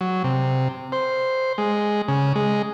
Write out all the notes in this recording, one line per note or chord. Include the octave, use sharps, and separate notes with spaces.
F#3
C3
C5
G#3
C#3
G#3